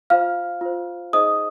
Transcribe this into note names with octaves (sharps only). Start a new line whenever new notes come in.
F4 C5 F5 F6
F4 C5
D#4 G#4 C5 D#5 D#6